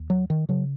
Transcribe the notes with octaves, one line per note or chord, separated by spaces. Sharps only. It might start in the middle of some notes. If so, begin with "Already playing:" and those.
Already playing: D#2
F#3
D#3
C#3 F#3